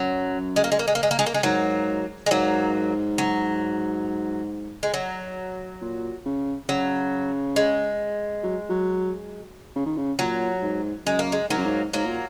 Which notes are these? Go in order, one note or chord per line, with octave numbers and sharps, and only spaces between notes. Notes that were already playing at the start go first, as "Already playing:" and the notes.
Already playing: F#2 F#3
G#3
A#3
G#3
A#3
G#3
A#3
G#3
A#3
G#3
A#3
G#3
G#2 F#3 A#3
G#3
G#2 F#3 A#3
F#3
G#3
F#3
A#2
C#3
C#3 F#3
G#3
F#3
F#3
C#3
D#3
C#3
A#2 F#3
G#2
F#2 G#3
A#3
G#3
G#2 F#3 A#3
F#2
G#2
G#2 F#3 A#3
A#2